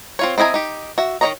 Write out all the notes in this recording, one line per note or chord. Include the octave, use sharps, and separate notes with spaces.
C4 F4 C#5
C4 E4 D#5 G#5 A#5
D#4 G4
F#4 E5
D#3 F4 C#5 D#5 A#5